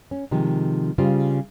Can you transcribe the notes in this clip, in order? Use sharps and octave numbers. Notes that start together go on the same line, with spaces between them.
C#4
C3 D#3 F3 G#3
C#3 G3 F4 C5